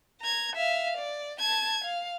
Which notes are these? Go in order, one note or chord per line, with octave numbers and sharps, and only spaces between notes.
A#5 G#6
E5 F5
D5
A5 G#6
F5